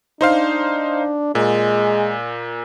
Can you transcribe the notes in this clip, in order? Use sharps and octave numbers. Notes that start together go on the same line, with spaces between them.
D4 D#4 C5 F5
A#2 G#3